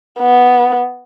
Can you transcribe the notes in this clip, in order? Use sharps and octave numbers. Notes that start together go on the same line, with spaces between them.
B3